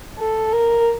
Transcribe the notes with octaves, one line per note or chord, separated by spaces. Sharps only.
A4
A#4